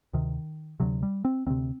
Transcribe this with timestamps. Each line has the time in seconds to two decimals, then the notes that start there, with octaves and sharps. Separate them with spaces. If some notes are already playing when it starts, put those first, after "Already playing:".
0.13 D2 C3 D#3
0.80 D2 C3 F#3
1.03 G3
1.25 C4
1.46 D2 C3 C4